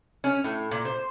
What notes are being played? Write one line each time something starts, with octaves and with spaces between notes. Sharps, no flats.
C#4
A2
A#2
C5